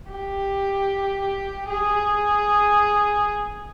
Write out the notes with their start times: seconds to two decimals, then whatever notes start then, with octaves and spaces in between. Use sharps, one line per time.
0.11 G4
1.69 G#4